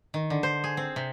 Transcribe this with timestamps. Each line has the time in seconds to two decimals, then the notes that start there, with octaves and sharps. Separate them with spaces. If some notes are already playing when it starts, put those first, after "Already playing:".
0.14 D#3
0.30 D3
0.43 C5
0.64 G#4
0.77 C4
0.96 C3